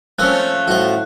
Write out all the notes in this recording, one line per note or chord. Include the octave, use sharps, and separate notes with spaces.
F3 A3 A#3 C4 C#4 A#4 F#6
A2 F#4 C5